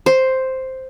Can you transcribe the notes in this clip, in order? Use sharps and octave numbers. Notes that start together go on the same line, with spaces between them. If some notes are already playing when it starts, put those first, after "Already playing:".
C5